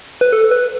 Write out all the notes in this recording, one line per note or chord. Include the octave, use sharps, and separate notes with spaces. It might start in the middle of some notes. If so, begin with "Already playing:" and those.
B4
A4
B4